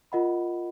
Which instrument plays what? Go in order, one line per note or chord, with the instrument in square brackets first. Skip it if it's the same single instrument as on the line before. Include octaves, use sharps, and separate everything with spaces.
[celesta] F4 A#4 D#5 F#5 B5